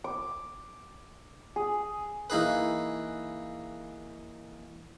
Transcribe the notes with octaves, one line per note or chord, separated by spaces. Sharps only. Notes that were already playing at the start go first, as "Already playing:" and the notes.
D6
G#4
E3 A#3 D#4 G#4 B4